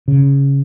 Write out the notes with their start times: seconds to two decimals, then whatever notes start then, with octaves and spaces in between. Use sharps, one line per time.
0.08 C#3